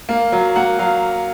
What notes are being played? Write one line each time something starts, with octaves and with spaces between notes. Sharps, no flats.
A#3
F#3
A#3 F#5
F#3 F5